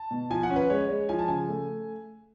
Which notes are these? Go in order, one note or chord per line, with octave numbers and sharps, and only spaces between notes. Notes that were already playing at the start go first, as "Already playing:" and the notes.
Already playing: A5
B2
F3 G#5
F#5
C#4
B4
G#3 C#5
G#3
F3 G#5
A5
C#3 G#5
A3